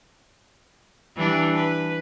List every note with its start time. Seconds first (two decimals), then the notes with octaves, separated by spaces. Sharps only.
1.16 E3 G3 D4
1.55 B4